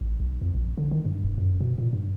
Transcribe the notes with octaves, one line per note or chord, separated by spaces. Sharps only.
A1
B1
F2
A#1
D3
D#3
G2
E1
F#2
B2
A#2
G2